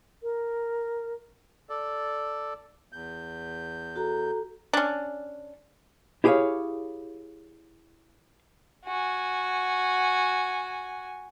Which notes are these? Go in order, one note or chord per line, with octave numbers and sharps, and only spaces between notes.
A#4
A4 D5
E2 G6
F#4 A4 A#5
C#4 D4
E4 G4 G#4 C5 C#5 F5
F#4 G#5